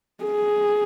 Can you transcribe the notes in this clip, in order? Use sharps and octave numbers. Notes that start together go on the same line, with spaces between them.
G#4